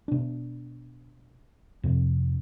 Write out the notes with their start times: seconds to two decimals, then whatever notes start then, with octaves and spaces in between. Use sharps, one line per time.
0.08 B2 D4
1.84 F2 C3